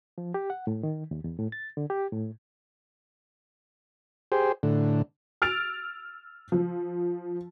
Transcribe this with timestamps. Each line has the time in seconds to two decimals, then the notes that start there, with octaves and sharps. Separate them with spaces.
0.18 F3
0.34 G4
0.50 F#5
0.67 A2
0.83 D#3
1.11 D#2
1.24 E2
1.39 A2
1.52 A6
1.77 D3
1.90 G4
2.12 A2
4.32 G4 G#4 C5
4.63 A2 D3
5.42 E6 F6 A6 D7 F7
6.52 F3